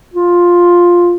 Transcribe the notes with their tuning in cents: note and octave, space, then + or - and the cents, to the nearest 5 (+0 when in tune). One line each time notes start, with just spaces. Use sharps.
F4 +5